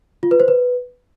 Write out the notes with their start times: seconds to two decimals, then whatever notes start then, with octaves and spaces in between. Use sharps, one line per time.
0.23 F4
0.31 B4
0.40 C5
0.48 B4